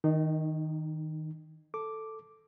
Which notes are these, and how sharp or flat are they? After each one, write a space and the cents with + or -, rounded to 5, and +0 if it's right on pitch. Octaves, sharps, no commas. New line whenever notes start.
D#3 +15 D#4 -25
A4 +0 D6 +0